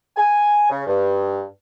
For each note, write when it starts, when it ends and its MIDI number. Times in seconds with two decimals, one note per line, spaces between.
0.17 0.68 80
0.70 0.83 49
0.87 1.43 43